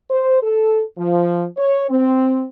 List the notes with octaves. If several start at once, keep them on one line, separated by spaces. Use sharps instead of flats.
C5
A4
F3
C#5
C4